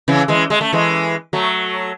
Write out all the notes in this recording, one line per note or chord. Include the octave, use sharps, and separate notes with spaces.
C#3 E3
E3 G#3
G#3
A3
E3 G#3
F#3 A3